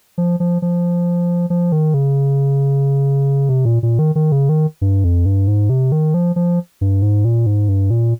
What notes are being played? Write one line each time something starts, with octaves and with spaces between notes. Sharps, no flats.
F3
F3
F3
F3
D#3
C#3
C3
A#2
A#2
D#3
D#3
C#3
D#3
G2
F2
G2
G#2
C3
D#3
F3
F3
G2
G#2
A#2
G#2
G2
A#2